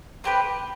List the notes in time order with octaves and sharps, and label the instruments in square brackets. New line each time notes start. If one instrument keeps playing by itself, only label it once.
[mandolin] C4 G4 B4